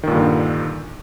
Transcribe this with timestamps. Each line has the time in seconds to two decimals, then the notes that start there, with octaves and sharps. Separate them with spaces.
0.03 D#3
0.07 A#2
0.11 G2
0.15 D3